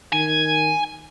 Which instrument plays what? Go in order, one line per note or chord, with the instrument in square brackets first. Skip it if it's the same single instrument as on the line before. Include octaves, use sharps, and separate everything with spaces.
[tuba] D#3 [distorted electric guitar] G#5